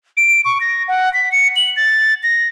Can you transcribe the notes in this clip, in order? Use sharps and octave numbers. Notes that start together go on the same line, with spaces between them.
D7
C#6
A#6
F#5
B6
C#7
F#7
A6
A#6